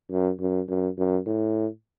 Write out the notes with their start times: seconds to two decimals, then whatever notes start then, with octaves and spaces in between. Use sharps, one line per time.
0.11 F#2
0.40 F#2
0.69 F#2
0.98 F#2
1.26 A2